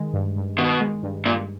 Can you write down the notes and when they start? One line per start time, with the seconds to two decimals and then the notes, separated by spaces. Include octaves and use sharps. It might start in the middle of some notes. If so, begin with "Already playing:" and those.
Already playing: D#3 G#3
0.14 G2
0.36 G2
0.58 B2 D#3
0.81 G#3
1.03 G2
1.26 G2 A#2